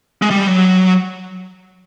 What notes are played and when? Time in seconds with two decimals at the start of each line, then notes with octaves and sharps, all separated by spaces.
0.22 G#3
0.30 G3
0.47 F#3